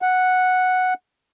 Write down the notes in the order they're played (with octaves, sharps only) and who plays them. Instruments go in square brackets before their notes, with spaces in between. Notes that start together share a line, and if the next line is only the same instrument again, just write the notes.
[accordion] F#5